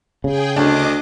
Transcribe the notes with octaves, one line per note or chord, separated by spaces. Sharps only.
C#3 G#4 G5
D2 D4 D#5 D6